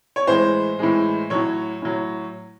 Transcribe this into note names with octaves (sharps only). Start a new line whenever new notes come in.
C#5
A2 E3 G#3 C5
A2 E3 G#3
A2 F#3 C#5
A2 F#3